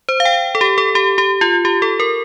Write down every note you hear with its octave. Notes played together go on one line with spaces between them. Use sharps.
C5
F5
G5
A4
G4
A4
G4
G4
F4
G4
A4
A#4